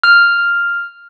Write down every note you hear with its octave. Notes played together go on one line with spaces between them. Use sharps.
F6